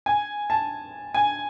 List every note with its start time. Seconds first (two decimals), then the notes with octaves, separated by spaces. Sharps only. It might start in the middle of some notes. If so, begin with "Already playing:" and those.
0.06 G#5
0.50 A5
1.14 G#5